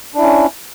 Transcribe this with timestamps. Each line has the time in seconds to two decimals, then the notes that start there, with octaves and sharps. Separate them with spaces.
0.15 D4
0.18 E4
0.22 C#4